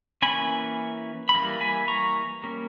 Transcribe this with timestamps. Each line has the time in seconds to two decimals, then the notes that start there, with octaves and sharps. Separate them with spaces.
0.22 E3 A#3 C#4 G#5 B5
1.29 B5
1.35 E3 G3 A#3
1.61 G#5 B5
1.88 A#5 C#6
2.43 G3 A#3 C#4